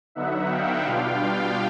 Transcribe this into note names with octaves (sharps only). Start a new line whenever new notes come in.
D3 F#3 B3 D#4 E5 F#5
F5 G5
B2 G3 B3 D4 F4 F5 G5